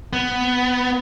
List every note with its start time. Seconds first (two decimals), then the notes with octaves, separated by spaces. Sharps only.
0.13 B3